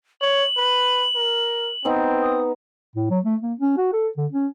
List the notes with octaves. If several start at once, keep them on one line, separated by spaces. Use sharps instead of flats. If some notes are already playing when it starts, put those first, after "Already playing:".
C#5 F#7
B4
A#4
B3 C4 D#4
D#6
A2
F#3
A3
A#3
C#4
F#4
A4
D3
C#4